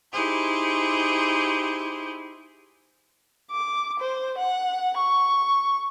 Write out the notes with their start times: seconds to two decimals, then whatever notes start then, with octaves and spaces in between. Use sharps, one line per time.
0.12 D#4 E4 G4 G#4 C5
3.51 D6
4.00 C5
4.38 F#5
4.97 C#6